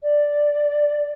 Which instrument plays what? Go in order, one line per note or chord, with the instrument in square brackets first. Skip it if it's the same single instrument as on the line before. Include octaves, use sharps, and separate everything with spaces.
[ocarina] D5